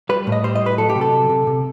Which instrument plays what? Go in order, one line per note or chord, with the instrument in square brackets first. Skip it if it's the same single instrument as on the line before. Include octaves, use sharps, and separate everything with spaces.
[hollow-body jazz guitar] G3 B4
A2
D#5
G3 C5
D#5
A2 B4
F#3 A4
G4
C3
A4
C3
C3
C3